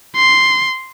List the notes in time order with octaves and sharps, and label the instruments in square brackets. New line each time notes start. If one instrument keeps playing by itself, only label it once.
[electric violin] C6